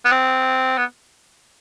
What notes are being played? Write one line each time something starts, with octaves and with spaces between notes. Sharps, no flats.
B3
C4
B3